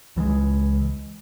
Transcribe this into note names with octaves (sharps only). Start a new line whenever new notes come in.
C#2 E3 F3 G#3